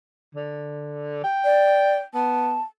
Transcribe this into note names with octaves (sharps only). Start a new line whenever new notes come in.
D3
G5
D5
B3 A5